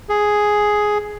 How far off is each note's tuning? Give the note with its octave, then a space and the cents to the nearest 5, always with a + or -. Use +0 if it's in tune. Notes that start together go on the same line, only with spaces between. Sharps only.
G#4 +5